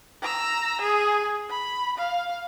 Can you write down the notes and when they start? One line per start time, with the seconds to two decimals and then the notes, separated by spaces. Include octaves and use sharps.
0.22 A#5 E6
0.81 G#4
1.49 B5
1.98 F5